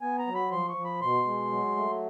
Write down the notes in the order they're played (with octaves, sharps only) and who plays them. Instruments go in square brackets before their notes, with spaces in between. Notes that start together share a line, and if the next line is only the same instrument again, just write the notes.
[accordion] B3 G#5
A#5
F#3
B5
F3 C6
C#6
F3
B5
B2 C6
G#3
F#3
A3